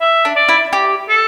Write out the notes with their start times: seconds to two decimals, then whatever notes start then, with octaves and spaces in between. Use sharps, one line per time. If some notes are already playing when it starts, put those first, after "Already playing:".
0.01 E5
0.25 D4
0.36 D5
0.49 E4
0.73 G4
1.09 A4